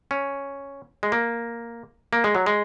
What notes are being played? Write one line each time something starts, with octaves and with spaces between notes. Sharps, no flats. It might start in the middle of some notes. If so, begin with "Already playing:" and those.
C#4
G#3
A#3
A#3
G#3
F#3
G#3